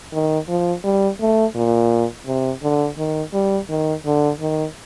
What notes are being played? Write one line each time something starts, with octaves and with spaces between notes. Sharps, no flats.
D#3
F3
G3
A3
A#2
C3
D3
D#3
G3
D#3
D3
D#3